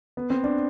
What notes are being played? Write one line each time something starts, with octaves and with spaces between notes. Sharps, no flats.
B3
C4
D4